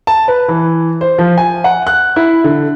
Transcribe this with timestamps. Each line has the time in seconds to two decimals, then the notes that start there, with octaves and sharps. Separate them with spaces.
0.07 A5
0.28 B4
0.49 E3
1.01 C5
1.19 F3
1.38 G#5
1.64 F#5
1.87 F#6
2.16 E4
2.44 D3